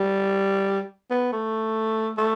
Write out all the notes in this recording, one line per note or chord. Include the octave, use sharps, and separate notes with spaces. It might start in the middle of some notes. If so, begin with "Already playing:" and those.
Already playing: G3
B3
A3
A3